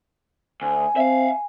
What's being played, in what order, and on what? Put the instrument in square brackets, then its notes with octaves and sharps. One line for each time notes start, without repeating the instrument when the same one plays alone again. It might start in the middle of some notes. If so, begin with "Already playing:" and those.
[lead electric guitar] D2 [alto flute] G#5
[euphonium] C4 [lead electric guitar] E5 F5